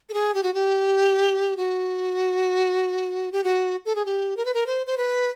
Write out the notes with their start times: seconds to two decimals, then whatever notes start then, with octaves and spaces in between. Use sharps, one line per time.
0.09 A4
0.14 G#4
0.34 G4
0.43 F#4
0.54 G4
1.57 F#4
3.32 G4
3.44 F#4
3.86 A4
3.95 G#4
4.05 G4
4.37 A#4
4.45 B4
4.54 A#4
4.67 C5
4.87 C5
4.97 B4